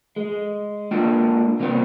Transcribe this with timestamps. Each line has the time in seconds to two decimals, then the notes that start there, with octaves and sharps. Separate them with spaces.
0.16 G#3
0.91 G#3 A#3 D4 F4 G5
1.60 C3 G3 A#3 B3 C5 G5